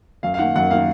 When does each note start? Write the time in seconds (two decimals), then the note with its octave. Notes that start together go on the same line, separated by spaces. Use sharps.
0.23 F#2 F5
0.34 F5
0.39 D#3 A#3 F#5
0.56 F#2 F#5
0.70 D#3 A#3 F5